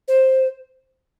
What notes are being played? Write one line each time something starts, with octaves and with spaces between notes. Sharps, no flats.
C5